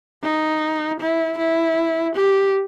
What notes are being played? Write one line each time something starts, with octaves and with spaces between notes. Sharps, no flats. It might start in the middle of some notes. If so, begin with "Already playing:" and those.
D#4
E4
E4
G4